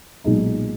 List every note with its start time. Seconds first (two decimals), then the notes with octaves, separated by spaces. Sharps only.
0.24 B1 A#2 G#3 D#4